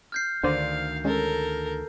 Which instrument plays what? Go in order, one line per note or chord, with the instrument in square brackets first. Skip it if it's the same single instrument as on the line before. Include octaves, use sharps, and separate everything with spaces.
[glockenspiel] F6 G6 C7
[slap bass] D2 D#3 [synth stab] D3 C5 D5 [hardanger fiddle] F5
[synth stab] G#3 C#4 [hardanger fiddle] A4 A#4